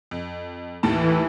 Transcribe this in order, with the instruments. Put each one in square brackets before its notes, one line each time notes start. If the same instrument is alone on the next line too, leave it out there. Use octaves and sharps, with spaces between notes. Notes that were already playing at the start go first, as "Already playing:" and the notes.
[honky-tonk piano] F2
[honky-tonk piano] D#2 A2 A5 [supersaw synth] E3